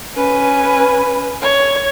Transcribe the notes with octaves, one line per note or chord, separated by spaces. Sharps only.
C#4 B4
C#5